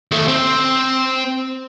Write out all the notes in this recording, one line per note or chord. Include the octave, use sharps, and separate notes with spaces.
D#2 A3
C4